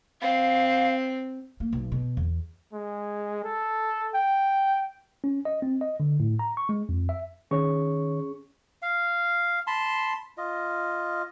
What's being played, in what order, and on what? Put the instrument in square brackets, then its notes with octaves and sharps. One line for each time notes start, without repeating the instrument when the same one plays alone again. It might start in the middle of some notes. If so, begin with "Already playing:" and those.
[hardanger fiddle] C4 [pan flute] F5
[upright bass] A#3
B1
B2
E2
[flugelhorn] G#3
A4
G5
[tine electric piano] C#4
D#5
C4
D#5
D3
A2
A#5
C#6
G#3
F2
E5
[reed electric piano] D#3 C#5 [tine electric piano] C#4 G#4 C#6
[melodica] F5
A5 B5 C6
F4 D#5